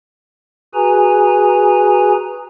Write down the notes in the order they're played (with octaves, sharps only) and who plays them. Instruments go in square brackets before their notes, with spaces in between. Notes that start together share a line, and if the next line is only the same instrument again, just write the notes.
[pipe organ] F#4 G#4 B4 G#5 A#5